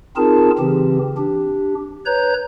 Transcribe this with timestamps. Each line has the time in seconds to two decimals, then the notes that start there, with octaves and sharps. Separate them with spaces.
0.16 C4 D#4 F4 G#4 A#4 A5
0.59 C#3 E3 C4 G4
1.17 D4 G4
2.06 B4 C#5 A#5 G6